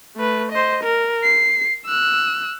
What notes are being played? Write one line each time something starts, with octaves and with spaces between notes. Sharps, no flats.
A3 B4
C5 D#5
A#4
C7
E6 F#6